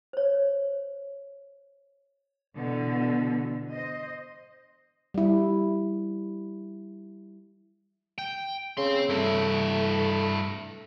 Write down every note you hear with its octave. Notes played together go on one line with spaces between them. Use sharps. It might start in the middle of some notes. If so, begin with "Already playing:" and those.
C5 C#5
B2 D3 E3
C5 D#5
G3 E4
G5
C#3 C4 C6
G2 A3 E4